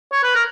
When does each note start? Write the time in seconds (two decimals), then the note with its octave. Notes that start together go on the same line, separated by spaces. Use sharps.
0.13 C#5
0.24 B4
0.35 A#4